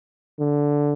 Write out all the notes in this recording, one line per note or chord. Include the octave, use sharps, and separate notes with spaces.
D3